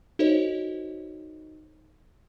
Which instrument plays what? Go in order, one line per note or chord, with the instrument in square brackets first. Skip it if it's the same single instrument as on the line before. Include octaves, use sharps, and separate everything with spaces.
[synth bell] D#4 F#4 A4 C5 C#5 D#5